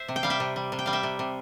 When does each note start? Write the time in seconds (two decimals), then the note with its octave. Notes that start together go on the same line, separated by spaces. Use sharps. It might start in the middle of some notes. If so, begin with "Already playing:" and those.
Already playing: C5 E5
0.08 C3
0.16 G5
0.23 G3 F5
0.30 E5 G5
0.40 C3
0.56 G3
0.72 C3
0.79 G5
0.86 G3 F5
0.93 E5 G5
1.03 C3
1.19 C3